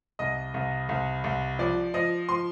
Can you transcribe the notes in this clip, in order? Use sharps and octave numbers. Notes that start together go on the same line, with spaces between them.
C2 D#5
C2
C2
C2
F3 D5
F3 D#5
F3 C6